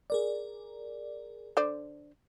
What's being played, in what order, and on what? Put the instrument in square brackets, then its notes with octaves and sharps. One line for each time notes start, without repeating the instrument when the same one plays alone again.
[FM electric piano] G#4 A#4 D5
[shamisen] D3 C5 D5